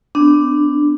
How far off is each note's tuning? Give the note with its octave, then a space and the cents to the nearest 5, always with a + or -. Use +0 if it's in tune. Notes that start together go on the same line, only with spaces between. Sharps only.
B3 +35 D4 +0